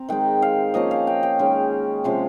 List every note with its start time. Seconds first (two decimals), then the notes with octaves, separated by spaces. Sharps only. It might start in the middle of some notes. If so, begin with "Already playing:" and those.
Already playing: C4 A#5
0.09 D#3 G#3 D#4 G5
0.42 F5
0.74 F3 A#3 C#4 D#5
0.91 F5
1.07 G5
1.23 G5
1.39 D#3 G#3 C#4
2.04 C3 F3 G#3 C#4 C6